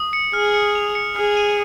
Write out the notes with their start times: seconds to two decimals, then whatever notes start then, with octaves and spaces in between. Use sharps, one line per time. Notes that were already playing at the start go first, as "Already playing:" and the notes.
Already playing: D#6
0.13 C#7
0.33 G#4 F6
0.54 C#7
0.75 F7
0.95 C#7
1.16 G#4 F6
1.37 D#7